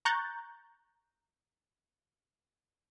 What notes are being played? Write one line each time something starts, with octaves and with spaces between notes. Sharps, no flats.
A#5 C#6 F#6 G6 A6